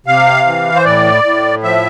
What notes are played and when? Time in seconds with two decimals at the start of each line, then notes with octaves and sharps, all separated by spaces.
0.06 C3 F5
0.46 E3
0.76 C5
0.85 A2 D5
1.24 A2
1.63 F3 E5